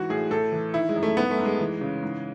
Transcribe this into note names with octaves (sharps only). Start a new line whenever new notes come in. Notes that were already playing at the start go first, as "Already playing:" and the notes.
Already playing: G#2 E3 F#4
A2 G#4
A2 A4
E3
D#3 E4
G#3
F#2
A3
G#2 B3
A3
G#2
G#3
E3
C#3
G#2